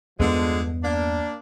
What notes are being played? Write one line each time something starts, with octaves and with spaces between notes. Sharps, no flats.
E2 G2 D3 F3 G#3 B3
A#3 D4